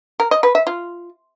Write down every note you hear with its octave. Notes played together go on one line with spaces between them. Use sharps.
A#4
D#5
B4
E5
F4